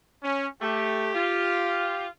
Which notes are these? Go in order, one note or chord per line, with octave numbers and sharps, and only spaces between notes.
C#4
A3 G4
F4